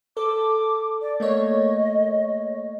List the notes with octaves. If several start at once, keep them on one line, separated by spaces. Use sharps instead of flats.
A4 D6
D5
A3 A#3 C#5 D#5